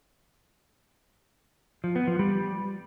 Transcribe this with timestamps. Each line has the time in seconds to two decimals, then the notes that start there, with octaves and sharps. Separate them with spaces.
1.84 F3
1.96 B3
2.07 F3
2.19 G3